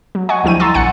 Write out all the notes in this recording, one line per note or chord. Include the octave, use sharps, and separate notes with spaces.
F#3
D#5 F#5 G#5 C#6
D2 F3 G3 E4 G5 D#7
A#5 C6 C#6 E6 A6
A#1 F#5 G#5 C#7